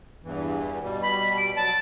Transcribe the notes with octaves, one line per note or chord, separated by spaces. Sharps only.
E2 G2 E3
B2 G3
B5
D7
F#3 A5